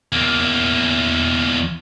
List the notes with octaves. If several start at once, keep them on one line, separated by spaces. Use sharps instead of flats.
E2 A#3